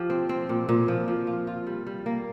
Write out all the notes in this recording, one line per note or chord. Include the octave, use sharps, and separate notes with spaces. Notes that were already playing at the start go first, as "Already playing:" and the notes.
Already playing: F3 G4
C4
C4
A#2
A#2
F3
F3
F4
F4
G3
G3
A#3